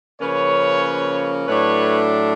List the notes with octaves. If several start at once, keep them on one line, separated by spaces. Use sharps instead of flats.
C#3 F3 A#3 C#4 B4 C#5
A2 F#3 A3 D4 B4 C#5